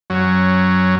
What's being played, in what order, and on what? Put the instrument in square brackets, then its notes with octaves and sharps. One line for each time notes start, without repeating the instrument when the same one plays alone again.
[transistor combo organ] F#2 F#3 C#4